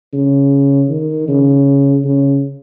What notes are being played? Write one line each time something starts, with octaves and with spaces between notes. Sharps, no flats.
C#3
D#3
C#3
C#3